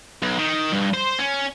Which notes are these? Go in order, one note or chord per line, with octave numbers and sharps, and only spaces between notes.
B1
D#3
G2
C5
C#4